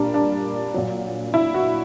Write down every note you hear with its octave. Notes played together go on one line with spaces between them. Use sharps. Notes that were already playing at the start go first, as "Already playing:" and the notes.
Already playing: A#2 G3 D4 A#4
D4
A#2 F#3
E4
F#4